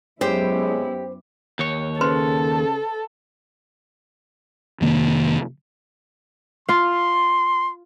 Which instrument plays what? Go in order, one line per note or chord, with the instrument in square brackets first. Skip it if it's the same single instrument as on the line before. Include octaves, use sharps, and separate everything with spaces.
[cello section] F#2 B3 E4 [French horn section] C3 G#3 C#4 [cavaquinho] G4 [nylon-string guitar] C5
[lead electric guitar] D#2 C#5
[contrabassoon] C#3 [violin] A4 [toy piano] B4 C5 C6
[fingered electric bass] F2 C3 D#3 A#3
[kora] F4 F5 [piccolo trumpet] C6